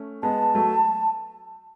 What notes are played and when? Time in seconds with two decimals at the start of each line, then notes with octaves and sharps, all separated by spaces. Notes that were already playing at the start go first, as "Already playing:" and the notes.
Already playing: A3 C#4
0.22 G#3 B3 A5
0.55 F#3 A3